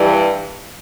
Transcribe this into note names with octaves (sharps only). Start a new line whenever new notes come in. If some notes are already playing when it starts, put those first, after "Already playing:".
Already playing: G2 E3 G3